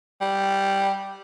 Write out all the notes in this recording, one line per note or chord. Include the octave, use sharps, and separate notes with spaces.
G3